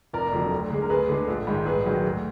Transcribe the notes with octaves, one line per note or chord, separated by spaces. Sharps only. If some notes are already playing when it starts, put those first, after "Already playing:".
F1 A#4 D5
F2 D3 F#3
D2
D3 G#3
A#4
D2 G#4 B4
D3 G#3
A#1
G#2 D#3 G#3
A#1 G#4 B4
G#2 D#3 F#3
D2